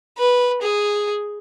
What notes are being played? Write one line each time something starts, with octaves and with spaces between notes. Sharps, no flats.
B4
G#4